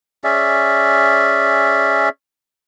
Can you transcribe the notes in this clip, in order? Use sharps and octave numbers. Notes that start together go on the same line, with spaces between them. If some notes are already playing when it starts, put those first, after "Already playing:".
C#4 G#4 D5 E5